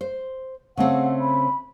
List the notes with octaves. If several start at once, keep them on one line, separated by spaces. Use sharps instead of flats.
C5
C#3 A3 C4 F#5
B5